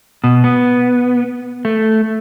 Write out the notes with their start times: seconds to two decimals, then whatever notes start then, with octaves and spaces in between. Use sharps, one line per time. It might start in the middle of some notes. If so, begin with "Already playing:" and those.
0.24 B2
0.44 B3
1.65 A3